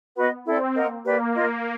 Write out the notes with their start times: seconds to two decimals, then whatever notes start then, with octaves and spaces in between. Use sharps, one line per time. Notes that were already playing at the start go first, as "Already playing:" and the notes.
0.16 B3 F#4 B4 D#5
0.45 C4 E4 A4 D5
0.75 A#3 A#4 D#5 F#5
1.05 A#3 G4 B4 D5
1.35 F4 A#4 D#5